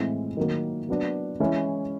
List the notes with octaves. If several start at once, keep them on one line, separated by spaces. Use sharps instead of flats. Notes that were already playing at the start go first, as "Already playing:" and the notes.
Already playing: A2 E3 G#3 C4
D#3 F#3 A#3
F#3 B3 D4
E3 G#3 C#4 E4